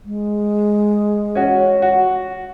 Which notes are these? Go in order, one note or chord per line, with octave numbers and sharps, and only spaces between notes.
G#3
C#4 F#4
F#4